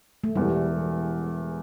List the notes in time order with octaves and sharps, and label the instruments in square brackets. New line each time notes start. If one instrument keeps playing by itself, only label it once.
[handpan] A3
[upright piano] E1 E2 E3 [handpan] G3